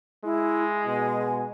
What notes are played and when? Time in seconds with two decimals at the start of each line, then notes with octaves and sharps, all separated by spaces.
0.24 G#3 E4
0.86 B2 G#5